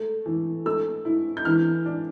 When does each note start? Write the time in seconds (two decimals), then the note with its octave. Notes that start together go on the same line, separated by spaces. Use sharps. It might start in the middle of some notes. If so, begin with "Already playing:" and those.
Already playing: A3
0.26 E3
0.66 A3 E6
1.05 E4
1.37 G6
1.45 E3 F6
1.85 D4